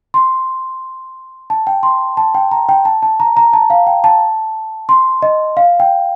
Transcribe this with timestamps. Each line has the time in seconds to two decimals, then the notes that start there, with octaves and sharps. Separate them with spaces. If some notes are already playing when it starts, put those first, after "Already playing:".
0.14 C6
1.50 A5
1.67 G5
1.83 C6
2.17 A5
2.35 G5
2.51 A#5
2.69 G5
2.85 A5
3.03 A5
3.20 A#5
3.37 A#5
3.54 A5
3.70 F5
3.87 G5
4.04 A5
4.89 C6
5.22 D#5
5.57 F5
5.80 G5